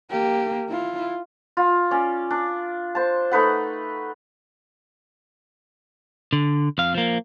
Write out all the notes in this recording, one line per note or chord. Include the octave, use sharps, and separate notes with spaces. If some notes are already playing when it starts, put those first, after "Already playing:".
A#3 G4
E4 F4
F4
C#4 D5
D4
C5 A5
A3 D#4 B4 F#5
D3
F2 F5
F3 A#3